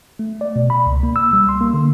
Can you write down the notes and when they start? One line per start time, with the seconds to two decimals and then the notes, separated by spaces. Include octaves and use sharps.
0.19 A3
0.41 D5
0.56 B2
0.70 B5
0.86 C#2
1.03 A#3
1.16 E6
1.33 G3
1.49 C6
1.61 A#3
1.74 D3